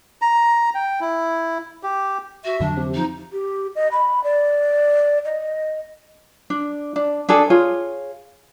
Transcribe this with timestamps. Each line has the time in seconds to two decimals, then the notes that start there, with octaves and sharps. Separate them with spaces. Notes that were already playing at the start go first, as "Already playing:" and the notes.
0.22 A#5
0.75 G5
1.00 E4
1.83 G4
2.45 F#4 E5
2.60 F2 D3 F#3 D4
2.77 C3 G4
2.94 F3 D#4
3.33 G4
3.75 D#5
3.92 B5
4.24 D5
5.25 D#5
6.50 D4
6.96 D4
7.29 D4 G#4 A4 G#5
7.50 F4 G#4 C#5